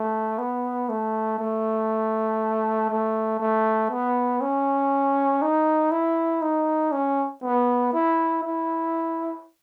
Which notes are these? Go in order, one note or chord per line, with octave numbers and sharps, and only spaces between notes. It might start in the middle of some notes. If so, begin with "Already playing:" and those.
Already playing: A3
B3
A3
A3
A3
A3
B3
C#4
D#4
E4
D#4
C#4
B3
E4
E4